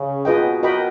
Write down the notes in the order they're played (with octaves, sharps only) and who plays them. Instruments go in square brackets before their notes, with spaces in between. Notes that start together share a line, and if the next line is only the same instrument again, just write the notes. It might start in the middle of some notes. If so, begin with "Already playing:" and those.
Already playing: [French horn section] C#3
[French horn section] B2 [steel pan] F4 G#4 B4 D#5 G5
[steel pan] F#4 A#4 D#5 G5 B5